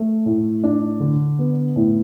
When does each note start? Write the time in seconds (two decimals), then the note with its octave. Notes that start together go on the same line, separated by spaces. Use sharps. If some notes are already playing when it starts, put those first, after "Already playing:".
Already playing: A3
0.26 A2
0.64 D4
1.00 D3
1.39 B3
1.76 A2